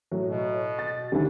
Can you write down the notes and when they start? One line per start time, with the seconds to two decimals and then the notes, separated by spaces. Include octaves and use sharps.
0.11 A2 F#3
0.27 B2
0.79 A6
1.12 D2 D3 D#3 G3